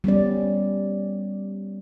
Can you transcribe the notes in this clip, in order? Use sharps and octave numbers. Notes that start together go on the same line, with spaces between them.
G3 B3 C#4 D5